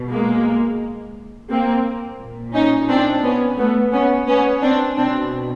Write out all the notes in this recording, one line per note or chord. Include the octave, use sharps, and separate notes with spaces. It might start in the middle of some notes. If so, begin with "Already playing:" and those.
Already playing: B2
G#3 A#3
A#3 C4
A#2
C#4 D#4
C4 D4
B3 C#4
A3 B3
B3 C#4
B3 C#4
C4 D4
B2 C4 D4